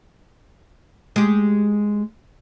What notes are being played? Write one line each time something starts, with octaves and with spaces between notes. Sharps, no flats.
G#3 G4